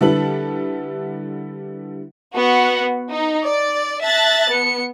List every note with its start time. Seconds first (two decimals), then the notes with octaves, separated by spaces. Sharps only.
0.01 D3 G3 E4 A4 B4 F#7
2.34 B3 F#4 F#5
3.10 D#4
3.44 D5
4.03 E5 A5 F#6 A6 A#6
4.51 B3 C#7